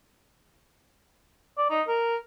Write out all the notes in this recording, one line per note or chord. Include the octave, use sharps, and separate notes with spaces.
D5
D#4
A#4